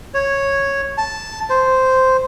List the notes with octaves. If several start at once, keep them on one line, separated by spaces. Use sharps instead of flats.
C#5
A5
C5